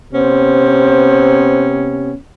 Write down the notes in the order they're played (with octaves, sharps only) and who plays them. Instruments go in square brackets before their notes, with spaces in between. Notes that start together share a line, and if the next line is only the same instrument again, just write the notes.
[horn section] C3 B3 C#4 [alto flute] C5